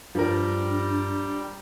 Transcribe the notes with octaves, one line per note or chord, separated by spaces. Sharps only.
G2 F3 G3 D4 A#4